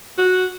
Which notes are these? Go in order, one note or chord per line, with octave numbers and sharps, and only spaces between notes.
F#4